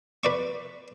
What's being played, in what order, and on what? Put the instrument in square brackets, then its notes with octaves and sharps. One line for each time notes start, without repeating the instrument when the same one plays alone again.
[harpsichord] B4 D5 C#6